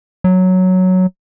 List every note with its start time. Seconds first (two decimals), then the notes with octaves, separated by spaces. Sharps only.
0.24 F#3